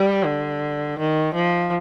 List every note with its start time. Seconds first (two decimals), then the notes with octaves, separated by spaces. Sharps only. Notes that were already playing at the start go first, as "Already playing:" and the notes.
Already playing: G3
0.26 D3
0.99 D#3
1.34 F3